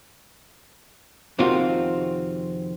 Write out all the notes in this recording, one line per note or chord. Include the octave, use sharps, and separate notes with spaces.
F2 C3 D#3 C4 F4 F#4